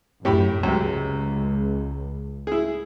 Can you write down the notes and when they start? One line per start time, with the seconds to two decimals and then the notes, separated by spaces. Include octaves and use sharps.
0.25 F#2 A2 G4 B5
0.63 C#2 F#2 C3
2.47 E4 G#4